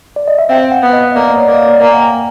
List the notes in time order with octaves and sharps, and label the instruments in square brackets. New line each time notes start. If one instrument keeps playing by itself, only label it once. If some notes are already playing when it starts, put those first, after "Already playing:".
[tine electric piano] D5
D#5
E5
[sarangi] C4 [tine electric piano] F5
[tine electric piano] F#5
[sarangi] B3
[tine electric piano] D#5
D#5
[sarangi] A#3 [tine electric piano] D5
[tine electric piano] D5
C#5
[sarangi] A#3
[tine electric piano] D#5
D5
[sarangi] A#3 [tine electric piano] G#5
[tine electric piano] F#5
G5